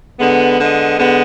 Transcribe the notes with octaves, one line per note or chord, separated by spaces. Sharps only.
D3 G#3 B3
D3 G#3 B3
D3 G#3 B3